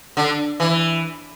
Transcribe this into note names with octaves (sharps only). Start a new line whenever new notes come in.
D3
E3